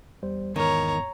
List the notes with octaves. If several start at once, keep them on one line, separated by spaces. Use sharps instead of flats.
E2 G3 C5
E2 G#2 D#3 A#4 C#5 A#5